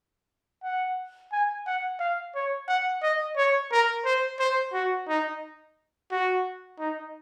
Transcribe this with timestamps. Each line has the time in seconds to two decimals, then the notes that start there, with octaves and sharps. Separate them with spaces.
0.63 F#5
1.32 G#5
1.66 F#5
2.00 F5
2.35 C#5
2.68 F#5
3.02 D#5
3.37 C#5
3.72 A#4
4.05 C5
4.39 C5
4.73 F#4
5.08 D#4
6.11 F#4
6.79 D#4